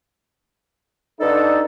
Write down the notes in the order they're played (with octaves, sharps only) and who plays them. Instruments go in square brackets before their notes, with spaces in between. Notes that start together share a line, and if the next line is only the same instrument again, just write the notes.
[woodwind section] G2 D3 A4 [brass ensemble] D4 D#4